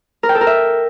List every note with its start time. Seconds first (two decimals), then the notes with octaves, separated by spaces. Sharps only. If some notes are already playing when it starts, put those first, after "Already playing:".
0.23 A#4
0.29 G5
0.35 A4
0.41 A#4
0.47 E5